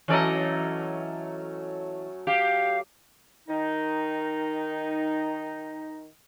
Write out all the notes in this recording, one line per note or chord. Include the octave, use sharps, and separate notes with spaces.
E3 F#3 A3 C#4 D5 D#5
G4 F5
D#3 D#4